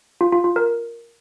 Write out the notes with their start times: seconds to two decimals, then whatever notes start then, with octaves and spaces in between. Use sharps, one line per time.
0.21 F4
0.32 F4
0.44 F4
0.56 A#4